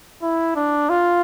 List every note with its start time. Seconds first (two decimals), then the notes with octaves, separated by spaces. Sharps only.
0.22 E4
0.56 D4
0.90 F4